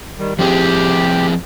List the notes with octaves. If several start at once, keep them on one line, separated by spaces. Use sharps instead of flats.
D#3 G3
F3 C4 G4 G#4